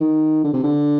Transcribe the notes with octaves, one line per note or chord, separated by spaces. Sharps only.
D#3
D3
C3
D3